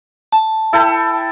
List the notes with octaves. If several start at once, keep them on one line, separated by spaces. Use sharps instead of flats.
A5
E4 A4 G5